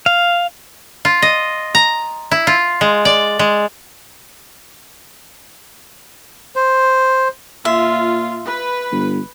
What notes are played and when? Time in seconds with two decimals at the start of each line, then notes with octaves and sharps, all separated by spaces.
0.06 F5
1.05 F4
1.22 D#5
1.75 A#5
2.31 E4
2.47 F4
2.81 G#3
3.05 D5
3.39 G#3
6.56 C5
7.65 A#2 F4 E5
8.45 B4
8.92 G1